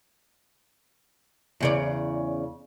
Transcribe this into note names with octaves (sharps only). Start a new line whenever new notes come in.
E2 C#3 D5